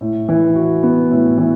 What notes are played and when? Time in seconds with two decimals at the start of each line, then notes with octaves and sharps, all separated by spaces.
0.01 A2
0.29 E3
0.55 F#4
0.83 B3
1.11 A2
1.38 E3